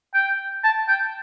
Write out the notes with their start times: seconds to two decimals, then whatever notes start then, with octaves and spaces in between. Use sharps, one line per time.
0.14 G5
0.64 A5
0.88 G5